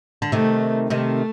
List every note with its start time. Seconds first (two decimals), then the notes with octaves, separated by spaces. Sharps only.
0.22 D3
0.32 C3 D#3 A3
0.90 C3 D#3 A3